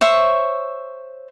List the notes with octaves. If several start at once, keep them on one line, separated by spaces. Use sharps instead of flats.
C5 C#5 E5 C#6